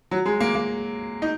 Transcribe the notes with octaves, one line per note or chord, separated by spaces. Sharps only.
F#3
G#3
A#3
A#3
D#4